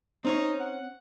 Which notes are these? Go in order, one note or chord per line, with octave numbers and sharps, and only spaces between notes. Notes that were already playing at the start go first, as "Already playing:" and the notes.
C4 C#4 D#4 C#5
F#5